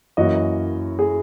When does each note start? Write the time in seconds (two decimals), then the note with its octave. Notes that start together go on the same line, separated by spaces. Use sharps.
0.17 F#2 E3 A#3 C#4 F#4 D#5
0.99 G#4